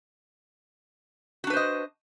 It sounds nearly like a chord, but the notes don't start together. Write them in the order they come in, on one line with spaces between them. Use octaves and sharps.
F#4 D4 B4 C5 D#5